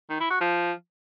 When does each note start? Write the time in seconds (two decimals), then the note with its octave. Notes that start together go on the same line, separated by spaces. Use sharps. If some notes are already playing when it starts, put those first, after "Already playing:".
0.10 D#3
0.20 E4
0.31 F#4
0.41 F3